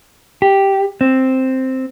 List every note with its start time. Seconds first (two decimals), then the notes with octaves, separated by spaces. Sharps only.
0.42 G4
1.01 C4